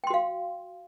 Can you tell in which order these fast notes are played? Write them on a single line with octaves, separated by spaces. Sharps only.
G5 C6 F#4 F5